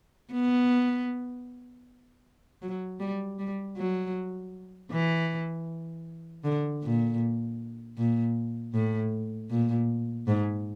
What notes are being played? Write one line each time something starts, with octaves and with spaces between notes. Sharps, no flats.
B3
F#3
G3
G3
F#3
E3
D3
A#2
A#2
A2
A#2
G#2